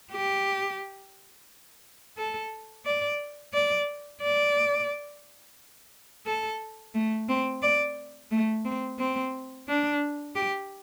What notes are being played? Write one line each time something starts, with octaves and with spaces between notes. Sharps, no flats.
G4
A4
D5
D5
D5
A4
A3
C4
D5
A3
C4
C4
D4
G4